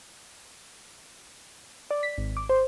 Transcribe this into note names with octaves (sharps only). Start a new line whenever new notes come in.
D5
B6
G#1
D6
C5